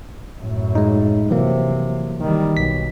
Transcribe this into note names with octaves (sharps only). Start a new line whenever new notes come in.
F#2 A2
G#3 D#4
C3 E3 F#3 A#3
D#3 G3
B1 B6